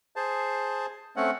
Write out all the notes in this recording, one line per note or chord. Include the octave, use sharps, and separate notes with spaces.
G#4 C5 A5
A3 C4 C#4 F#5